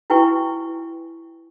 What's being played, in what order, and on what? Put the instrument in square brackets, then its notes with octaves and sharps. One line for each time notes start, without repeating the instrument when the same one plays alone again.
[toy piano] E4 F#4 B4 G5 G#5 C#6